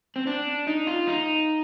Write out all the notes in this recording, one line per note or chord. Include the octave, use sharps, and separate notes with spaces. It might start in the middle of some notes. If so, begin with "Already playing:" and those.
C4
D4
D#4
F4
D#4